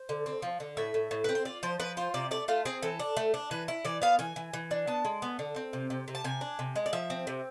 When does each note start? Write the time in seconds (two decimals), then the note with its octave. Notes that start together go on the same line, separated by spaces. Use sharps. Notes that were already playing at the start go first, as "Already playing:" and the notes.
Already playing: C5
0.09 D3
0.26 C4
0.42 F3
0.60 D3
0.77 A2 E5
0.94 A2
1.11 A2
1.24 C4 B4
1.35 C5
1.45 F4 D5
1.63 F3 C5
1.80 F3 B4
1.97 F4 C5
2.14 C3 D5
2.31 A3 D5
2.48 A3 F4
2.65 C4 G#4
2.82 E3 A4
2.99 D4
3.17 A3
3.34 D4
3.51 E3 B4
3.68 E4
3.85 E3 D5
4.02 B3 F5
4.19 E3 G#5
4.36 E3
4.53 E3
4.71 D4
4.87 B3 A5
5.05 G#3
5.22 B3
5.39 D3
5.56 C4
5.73 C3
5.90 C3
6.08 C3
6.15 A5
6.24 C3 G#5
6.41 D4
6.59 C3
6.76 G#3
6.86 D5
6.93 F3 E5
7.10 C4
7.27 C3